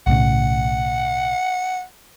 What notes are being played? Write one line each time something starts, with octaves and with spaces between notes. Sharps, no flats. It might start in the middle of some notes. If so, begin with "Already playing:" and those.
B1 A2 C#3 F#5